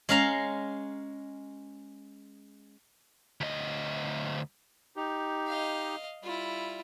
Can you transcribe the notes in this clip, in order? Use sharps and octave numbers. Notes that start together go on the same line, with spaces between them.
G#3 C#4 F5 A#5
D2 D#5
D#4 G4
D#5 F5
G3 E4 F4